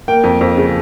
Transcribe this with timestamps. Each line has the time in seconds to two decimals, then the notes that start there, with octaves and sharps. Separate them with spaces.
0.08 A#3 G5
0.24 F2
0.41 F2
0.57 C#3